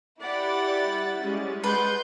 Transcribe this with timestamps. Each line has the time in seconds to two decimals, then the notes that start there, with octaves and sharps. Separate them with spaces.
0.22 E4 G4 D5 F#5 B5 A6
0.84 G3
1.21 G3 G#3 C#4
1.64 G#3 B4 F#5 C6 G6